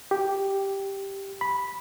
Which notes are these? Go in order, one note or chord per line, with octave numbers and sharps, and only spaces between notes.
G4
B5